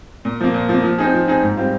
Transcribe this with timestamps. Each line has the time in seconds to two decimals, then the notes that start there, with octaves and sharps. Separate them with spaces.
0.25 A#2
0.40 F3 A#3
0.54 A#2
0.69 F3 A#3
0.83 F3
0.99 C4 D#4 G#4
1.13 F3
1.28 C4 D#4 G#4
1.43 G#2
1.57 G3 C4 F4